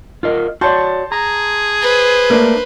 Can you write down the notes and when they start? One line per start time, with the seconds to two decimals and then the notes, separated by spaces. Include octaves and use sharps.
0.23 F4 A#4 D#5
0.61 F#4 C#5 D5 A5 C6 G6
1.12 G#4 A#5
1.81 B4 C5
2.30 A3 A#3 D4 A#4